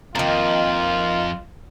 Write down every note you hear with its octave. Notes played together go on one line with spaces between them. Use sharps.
F2 D#3 A#3 F4